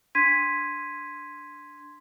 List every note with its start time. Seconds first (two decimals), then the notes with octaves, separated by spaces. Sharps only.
0.15 D4 C6 G#6 B6 D#7